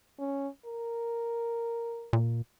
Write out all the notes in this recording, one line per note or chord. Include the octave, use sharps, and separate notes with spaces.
C#4
A#4
A#2